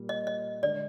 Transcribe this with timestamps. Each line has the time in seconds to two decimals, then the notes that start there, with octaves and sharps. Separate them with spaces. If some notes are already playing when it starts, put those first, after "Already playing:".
Already playing: A#2 G3 A#3
0.09 D#5
0.27 D#5
0.63 D3 G#3 D4 D5